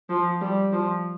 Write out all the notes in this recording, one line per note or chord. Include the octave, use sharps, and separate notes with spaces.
F3
G3
F3